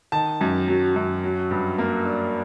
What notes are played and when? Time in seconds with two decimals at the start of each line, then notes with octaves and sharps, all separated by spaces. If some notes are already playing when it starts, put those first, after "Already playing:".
0.12 D#3 A5
0.41 F#2
0.68 F#3
0.96 F#2
1.24 F#3
1.51 G2
1.78 A#3
2.05 D4